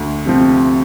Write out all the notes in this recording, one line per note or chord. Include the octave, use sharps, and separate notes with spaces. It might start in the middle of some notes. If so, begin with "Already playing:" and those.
Already playing: D2
C3 F3 C4